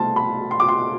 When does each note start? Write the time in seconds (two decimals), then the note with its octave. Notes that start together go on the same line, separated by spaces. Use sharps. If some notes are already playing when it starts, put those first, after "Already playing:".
Already playing: C2 B2 A3 C4 A5 C6
0.16 B5
0.51 C6
0.60 D6
0.69 C6